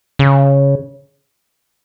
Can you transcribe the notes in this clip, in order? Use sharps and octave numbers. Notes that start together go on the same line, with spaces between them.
C#3